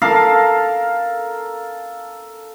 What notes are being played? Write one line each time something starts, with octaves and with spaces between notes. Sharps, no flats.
A4 A#4 F5